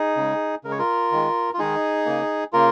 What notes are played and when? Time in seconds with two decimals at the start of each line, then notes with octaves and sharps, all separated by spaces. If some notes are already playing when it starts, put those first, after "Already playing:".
Already playing: D#4 G#4
0.17 C#3 G#3
0.64 C#3 G#3 A#4
0.72 C#5
0.79 F4 A#4
1.12 D#3 G#3
1.54 F4
1.59 D#3 G#3 D#4 G#4
2.06 C#3 A#3
2.53 C#3 A#3 F4 A#4